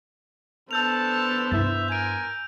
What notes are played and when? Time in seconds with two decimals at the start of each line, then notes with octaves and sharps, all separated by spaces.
0.71 B3 D4 A4 C5 A5 E6 G6 F7
1.52 G2 E4 E5
1.88 A#4 G#5 G6 D7